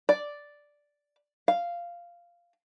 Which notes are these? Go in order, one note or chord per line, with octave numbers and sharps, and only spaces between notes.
D5
F5